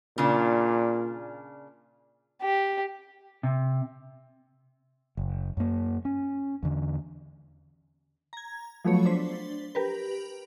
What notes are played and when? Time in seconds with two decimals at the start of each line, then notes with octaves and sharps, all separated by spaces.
0.18 A#2 C#3 D4
2.42 G4
3.43 C3
5.17 F#1
5.57 F#2 A#3
6.05 C#4
6.63 E2 D3
8.33 A#5 G#6
8.85 F3 F#3 A3 B3 C#5
9.06 D4 C5 B6
9.75 G4 A#4 B4